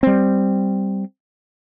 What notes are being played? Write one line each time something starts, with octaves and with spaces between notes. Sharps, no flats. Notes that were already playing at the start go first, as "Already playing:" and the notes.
G3 C4